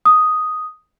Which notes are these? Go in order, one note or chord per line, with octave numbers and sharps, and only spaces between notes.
D#6